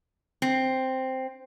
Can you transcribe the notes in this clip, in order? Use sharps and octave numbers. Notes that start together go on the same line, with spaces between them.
C4